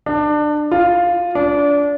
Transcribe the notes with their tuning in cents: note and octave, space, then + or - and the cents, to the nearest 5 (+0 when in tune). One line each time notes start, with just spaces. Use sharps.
D4 +25
F4 +5
D4 -25